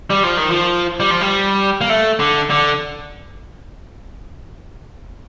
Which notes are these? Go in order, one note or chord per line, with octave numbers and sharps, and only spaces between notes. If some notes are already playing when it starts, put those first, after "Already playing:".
G3
F3
D#3
F3
G3
F3
G3
A#3
A3
D3
D3